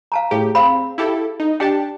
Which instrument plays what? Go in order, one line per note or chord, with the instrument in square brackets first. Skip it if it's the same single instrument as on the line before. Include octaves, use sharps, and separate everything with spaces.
[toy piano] F5 A5 A#5
[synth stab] A2 G4 [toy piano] G#4
[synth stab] C4 [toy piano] F5 B5
[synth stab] E4 G4 A4
D#4
[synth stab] D4 G4 A5 [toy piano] G5